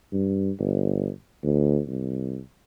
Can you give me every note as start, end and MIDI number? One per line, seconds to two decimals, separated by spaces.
0.12 0.51 43
0.59 1.10 31
1.43 1.80 38
1.87 2.40 36